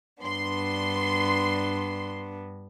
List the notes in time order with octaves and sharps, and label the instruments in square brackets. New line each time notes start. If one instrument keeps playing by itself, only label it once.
[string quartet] G2 B3 D4 [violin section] C6